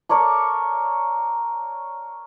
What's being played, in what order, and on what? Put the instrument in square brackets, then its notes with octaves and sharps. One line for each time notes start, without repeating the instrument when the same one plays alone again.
[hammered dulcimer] A#4 C#5 D5 A5